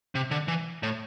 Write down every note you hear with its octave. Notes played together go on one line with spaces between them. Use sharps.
C3
D3
E3
A2